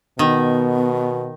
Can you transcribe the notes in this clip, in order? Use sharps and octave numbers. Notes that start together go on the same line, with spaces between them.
B2 D#3 B3